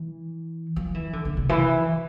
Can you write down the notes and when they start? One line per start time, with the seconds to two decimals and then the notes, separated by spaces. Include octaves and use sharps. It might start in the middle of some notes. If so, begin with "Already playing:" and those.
Already playing: E3
0.76 F3
0.94 E3
1.13 D3
1.25 D3
1.37 C3
1.49 E3